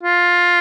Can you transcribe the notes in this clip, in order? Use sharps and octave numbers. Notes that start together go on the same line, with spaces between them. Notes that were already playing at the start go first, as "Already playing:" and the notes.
F4